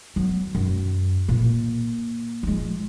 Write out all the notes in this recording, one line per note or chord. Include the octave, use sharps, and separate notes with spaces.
F#3 B3
F#2
A#2 A#3
F3 G#3